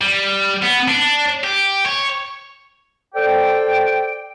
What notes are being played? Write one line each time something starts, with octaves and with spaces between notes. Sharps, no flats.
G3
B3
D4
G4
C#5
A4 C5 D5 G5